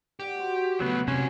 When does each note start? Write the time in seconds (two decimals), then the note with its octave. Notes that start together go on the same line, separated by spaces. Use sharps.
0.19 G4 D5 F#5
0.36 F#4 C5
0.80 C#3 F#3 A3 B3
1.08 C3 G#3 C#4 F#4